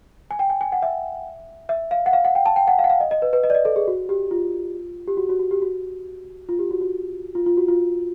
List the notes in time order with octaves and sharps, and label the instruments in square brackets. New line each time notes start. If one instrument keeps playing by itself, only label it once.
[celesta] G#5
G5
G#5
G#5
F#5
E5
E5
F5
F#5
F5
F#5
G5
A5
G5
F#5
F5
F#5
F5
D#5
D#5
B4
B4
D#5
D5
D#5
A4
G#4
F#4
G4
F4
G4
F#4
F#4
F#4
G4
F#4
F4
G4
F#4
F#4
F4
F4
F#4
F4